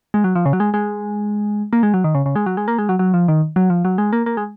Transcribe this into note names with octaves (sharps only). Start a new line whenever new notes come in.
G#3
F#3
F3
C#3
F#3
G#3
G#3
A#3
G#3
F#3
D#3
C#3
C#3
G#3
F#3
G#3
A#3
G#3
F#3
F#3
F3
D#3
F#3
F3
F#3
G#3
A#3
A#3
G#3